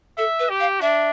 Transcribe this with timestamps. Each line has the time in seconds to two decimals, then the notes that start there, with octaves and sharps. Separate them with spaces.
0.18 A4 E5
0.39 B4
0.49 G4
0.60 F5
0.81 D4 E5